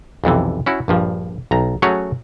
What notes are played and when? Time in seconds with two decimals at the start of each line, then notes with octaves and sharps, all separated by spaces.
0.24 B1 F2 C3 E3
0.66 C#4 E4 F#4
0.88 A#1 G2 F3
1.51 B1 A#5
1.82 F#3 A3 C#4 F#4 G#4 C#5